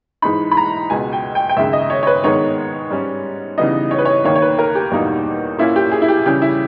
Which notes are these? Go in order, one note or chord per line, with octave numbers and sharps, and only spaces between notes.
G#2 E3 G#3 D#4 B5
B5
A#5
C#2 B2 G#3 G#5
G5
G5
G5
D#2 C#3 G#3 E5
D#5
C#5
C#5
B4
G#2 D#3 G#3 B3 D#4 C#5
G#2 G3 C#4
C#3 E3 G3 B3 D#4 D#5
C#5
B4
C#5
D#2 D#3 A#3 C#5
C#5
B4
A#4
G4
E2 B2 G3 A#3 D#4
A#2 A#3 C#4 E4
G4
G#4
E4
G4
C#3 E3 G3 C#4 G4
E4